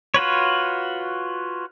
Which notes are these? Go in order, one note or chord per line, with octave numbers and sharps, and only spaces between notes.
F4 F#4 B4 C#5